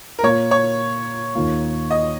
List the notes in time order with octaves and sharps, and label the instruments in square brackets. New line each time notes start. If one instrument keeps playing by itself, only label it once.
[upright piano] A#4
[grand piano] A#2 A#3 F4 [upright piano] C#5
[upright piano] C#5
[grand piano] D#2 D#3 A#3 F4
[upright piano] D#5